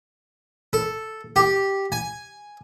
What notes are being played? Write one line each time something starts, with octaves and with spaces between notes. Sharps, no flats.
A4
G4
G#5